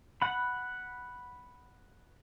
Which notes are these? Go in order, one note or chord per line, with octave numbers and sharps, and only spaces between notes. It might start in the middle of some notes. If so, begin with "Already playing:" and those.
F#5 B5